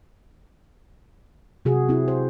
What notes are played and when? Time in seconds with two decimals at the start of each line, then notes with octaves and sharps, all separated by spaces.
1.65 C3 F#4 G#4
1.89 C4 E4
2.08 C5